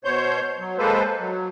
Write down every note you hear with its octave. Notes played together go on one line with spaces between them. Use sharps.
B2 C5 C#5 G6
F#3
G#3 A#3 A4 B4 C5
F#3